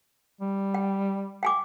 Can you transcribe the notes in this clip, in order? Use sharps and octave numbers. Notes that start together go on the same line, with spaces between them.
G3
G5
G5 G#5 D6